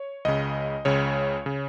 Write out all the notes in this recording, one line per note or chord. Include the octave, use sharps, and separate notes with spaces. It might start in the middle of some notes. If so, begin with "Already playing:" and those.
Already playing: C#5
C#2 C#3 D#5
C#2 C#3 C#5
C#3